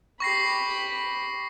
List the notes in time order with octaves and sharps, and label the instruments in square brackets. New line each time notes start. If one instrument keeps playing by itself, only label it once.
[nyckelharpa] G4 B5 [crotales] C#6 A#6 C7